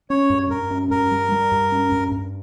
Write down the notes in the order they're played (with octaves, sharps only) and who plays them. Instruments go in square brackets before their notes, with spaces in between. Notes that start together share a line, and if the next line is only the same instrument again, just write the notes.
[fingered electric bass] C#4 [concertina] C#5
[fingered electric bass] G2
[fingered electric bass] G2 [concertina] A#4
[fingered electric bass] C#4
[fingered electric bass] G2 [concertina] A#4
[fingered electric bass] G3
G3
G2
C#4
G2
G2